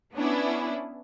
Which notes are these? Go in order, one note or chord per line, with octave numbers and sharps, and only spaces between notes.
B3 C#4 D4 E4